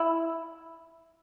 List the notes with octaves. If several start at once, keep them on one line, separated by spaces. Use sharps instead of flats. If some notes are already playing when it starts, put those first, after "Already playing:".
Already playing: E4